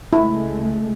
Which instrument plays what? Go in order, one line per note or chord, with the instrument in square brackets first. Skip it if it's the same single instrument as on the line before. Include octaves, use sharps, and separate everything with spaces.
[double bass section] C#2 G#3 A3 [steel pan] E4